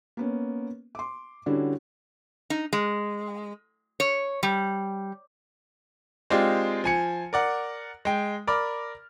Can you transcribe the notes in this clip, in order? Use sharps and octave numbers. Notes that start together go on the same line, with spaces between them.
A#3 B3 C#4
C6 D6
D3 G3 C#4 D4 E4 F#4
D#4
G#3
C#5
G3
G#3 C4 D4 D#4 F4 G4
F3 G#5 C#7
A#4 D5 F#5
G#3 G5
A#4 D5 B5 D6 F6